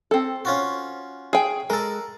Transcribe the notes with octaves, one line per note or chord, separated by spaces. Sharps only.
C4 A4
C#4 F4 F#4
G#4 G5
G#3 A4 A#4